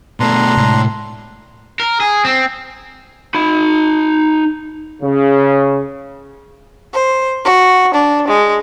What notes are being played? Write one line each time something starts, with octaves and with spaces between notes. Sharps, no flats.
B2 A3 D4 A#5 C6
A2 C3 G#3
A#4
G#4
C4
D#4 B5
C#3
C5
F#4
D4
G#3